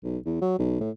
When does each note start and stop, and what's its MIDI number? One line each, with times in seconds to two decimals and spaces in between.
0.04 0.18 35
0.26 0.40 40
0.42 0.57 54
0.59 0.78 35
0.81 0.91 45